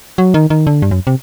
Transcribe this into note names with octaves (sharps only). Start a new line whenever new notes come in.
F#3
D#3
D#3
D3
G2
F#2
C3